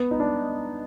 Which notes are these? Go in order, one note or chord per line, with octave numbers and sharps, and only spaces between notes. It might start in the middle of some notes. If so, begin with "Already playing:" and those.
Already playing: B3
D#4
D4